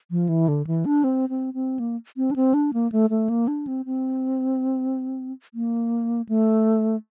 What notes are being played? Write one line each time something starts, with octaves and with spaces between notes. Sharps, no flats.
F3
E3
D3
E3
D4
C4
C4
C4
A#3
C4
D4
C4
D4
A#3
A3
A3
A#3
D4
C4
C4
A#3
A3